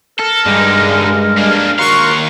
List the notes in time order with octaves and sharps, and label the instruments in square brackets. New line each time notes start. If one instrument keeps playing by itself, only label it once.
[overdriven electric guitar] A4 [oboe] A#4
[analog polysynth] G2 G#3 [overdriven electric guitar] D3 D#4
[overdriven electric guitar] A#3 D4
[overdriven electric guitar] D#2 F5 [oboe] F#4 [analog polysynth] A#4 C6 C#6